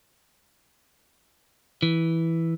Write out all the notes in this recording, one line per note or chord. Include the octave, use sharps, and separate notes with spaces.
E3